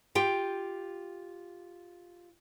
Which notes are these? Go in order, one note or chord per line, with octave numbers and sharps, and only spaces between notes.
F4 G4 G5